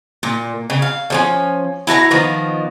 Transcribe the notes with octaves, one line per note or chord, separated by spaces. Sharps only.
A#2
C#3
F5
D3 F3 C#4
E4 F#4 A5 A#5
D#3 F3 A#3 B3